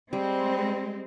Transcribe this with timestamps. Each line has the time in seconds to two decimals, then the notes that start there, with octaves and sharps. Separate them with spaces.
0.13 G3 G#3 C4